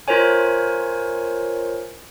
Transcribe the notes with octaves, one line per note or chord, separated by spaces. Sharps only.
F4 A#4 C5 C#5 G#5